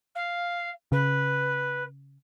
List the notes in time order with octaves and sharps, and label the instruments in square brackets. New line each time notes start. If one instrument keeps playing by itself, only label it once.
[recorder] F5
[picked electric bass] C#3 [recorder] B4